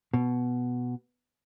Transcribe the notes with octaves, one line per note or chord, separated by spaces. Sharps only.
B2